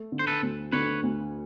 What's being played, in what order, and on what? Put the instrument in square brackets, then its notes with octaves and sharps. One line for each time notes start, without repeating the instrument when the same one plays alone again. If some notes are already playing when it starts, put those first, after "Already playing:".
Already playing: [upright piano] A3
D3
[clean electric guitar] C5
A4 B4
[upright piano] D2
[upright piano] D3 [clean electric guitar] B4 C#5
[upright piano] D2